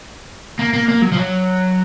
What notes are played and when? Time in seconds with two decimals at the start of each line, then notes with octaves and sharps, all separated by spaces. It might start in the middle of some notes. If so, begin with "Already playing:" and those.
0.59 A#3
0.74 A#3
0.88 A#3
1.02 F#3
1.12 F3
1.17 F#3